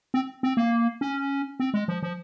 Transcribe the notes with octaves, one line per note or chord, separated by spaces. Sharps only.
C4
C4
A#3
C#4
C4
G#3
F3
F3